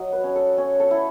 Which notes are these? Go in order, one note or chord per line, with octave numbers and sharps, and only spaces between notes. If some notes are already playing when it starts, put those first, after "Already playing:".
Already playing: F#3 D#5
B4
C#4
A4
C#4
A4
E4